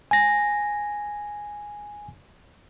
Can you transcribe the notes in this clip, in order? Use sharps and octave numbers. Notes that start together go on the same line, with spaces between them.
G#5 A#6